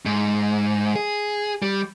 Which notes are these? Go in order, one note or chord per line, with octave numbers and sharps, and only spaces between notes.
G#2
G#4
G3